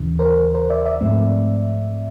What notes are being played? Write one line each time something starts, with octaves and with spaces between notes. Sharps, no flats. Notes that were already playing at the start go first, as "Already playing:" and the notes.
Already playing: D#2 C#3 E3
A#4 C5
A#4 C5
D5 E5
D5 E5
G#2 F3 A3 C4